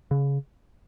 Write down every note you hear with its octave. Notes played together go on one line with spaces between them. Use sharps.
C#3